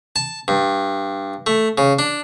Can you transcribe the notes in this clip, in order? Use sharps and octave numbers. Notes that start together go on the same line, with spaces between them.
A5
G2
A3
C#3
D4